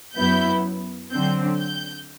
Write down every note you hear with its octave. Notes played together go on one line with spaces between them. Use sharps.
F#2 F#3 B3 E4 G6
D3 F#3 C4 G6
G6